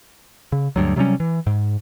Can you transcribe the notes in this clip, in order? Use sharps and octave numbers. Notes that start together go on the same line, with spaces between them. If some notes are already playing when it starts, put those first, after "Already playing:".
C#3
D2 G2 F#3
C3 F#3 G3 C#4
E3
G#2